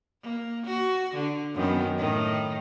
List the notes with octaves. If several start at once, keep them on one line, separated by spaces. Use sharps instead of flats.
A#3
F#4
D3
F#2 D#3 B3
A2 D#3